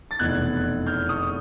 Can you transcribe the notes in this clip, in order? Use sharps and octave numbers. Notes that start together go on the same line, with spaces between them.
A6
F1 E2 B2 F#6 G#6
F6 G6
C#6 D#6